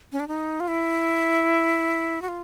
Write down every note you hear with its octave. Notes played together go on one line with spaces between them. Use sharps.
C#4
D4
D#4
F4
E4
F#4
F4